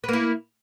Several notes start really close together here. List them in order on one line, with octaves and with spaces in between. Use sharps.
B4 A#3 E4